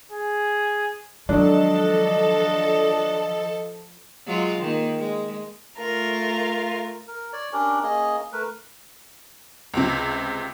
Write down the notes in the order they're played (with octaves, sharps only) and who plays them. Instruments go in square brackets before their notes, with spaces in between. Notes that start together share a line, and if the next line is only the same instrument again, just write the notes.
[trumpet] G#4
[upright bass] D#3 G#3 [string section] F3 A4 [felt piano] F#3 D4 [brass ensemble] D#5
[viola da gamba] F#3 G#3 F4
D#3 A#3
G#3
[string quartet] A3 F4 A#4
[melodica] A#4
C#5 D5
C#4 D4 G4 A#4
A#3 C#4 G#4 D#5
A3 A#4 B4
[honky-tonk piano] C#2 C3